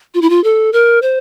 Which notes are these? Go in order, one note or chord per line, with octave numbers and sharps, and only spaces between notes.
F4
E4
F4
A4
A#4
C5